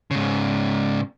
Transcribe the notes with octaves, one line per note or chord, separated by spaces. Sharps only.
G#2 C#3